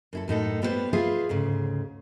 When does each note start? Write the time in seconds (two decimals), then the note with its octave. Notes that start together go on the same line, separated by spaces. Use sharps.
0.13 F#2 E4 A4
0.28 F#2 A2 D#4 A4
0.62 G3 B3 A4 B4 C5 D5
0.93 F4 G#4 B4 E5 F5
1.29 D2 G#2 C#3